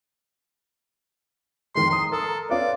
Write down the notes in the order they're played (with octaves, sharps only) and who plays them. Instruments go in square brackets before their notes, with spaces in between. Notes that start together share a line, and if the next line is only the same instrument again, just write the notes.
[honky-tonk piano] F2 D#3 G#3 [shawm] C6
[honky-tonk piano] A#5 D#6 [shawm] C6
[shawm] A4 [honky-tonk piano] A#4
[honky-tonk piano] C#4 F4 B4 [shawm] D5